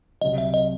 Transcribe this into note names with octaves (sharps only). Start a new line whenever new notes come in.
C2 C3 F#3 D#5
E5
D#5